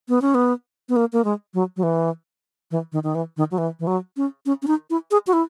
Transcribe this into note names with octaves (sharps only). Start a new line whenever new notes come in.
B3
C#4
B3
B3
A#3
A#3
G#3
F#3
F#3
E3
E3
D#3
D#3
E3
D#3
F#3
E3
E3
F#3
C#4
C#4
C#4
D#4
E4
G#4
F#4
E4